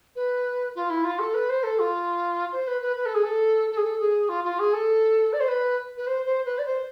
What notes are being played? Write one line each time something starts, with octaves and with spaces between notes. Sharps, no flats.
B4
F4
E4
F4
A4
B4
C5
A4
F4
C5
B4
B4
B4
A4
G#4
A4
A4
G#4
A4
G#4
F4
F4
G#4
A4
D5
C5
B4
B4
C5
C5
B4
D5
C5